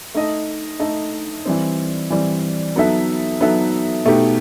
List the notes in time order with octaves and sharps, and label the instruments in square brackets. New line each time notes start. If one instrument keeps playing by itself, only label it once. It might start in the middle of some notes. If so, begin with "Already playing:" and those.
[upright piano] A3 D#4 A4 D#5
A3 D#4 A4 D#5
E3 G3 C4
E3 G3 C4
F#3 B3 D#4 A4 E5
F#3 B3 D#4 A4 E5
B2 A3 D#4 G4